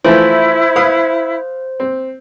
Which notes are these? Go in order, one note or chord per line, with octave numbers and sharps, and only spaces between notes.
E3 F3 A3 E4 C5
B4 F5 D#6
C4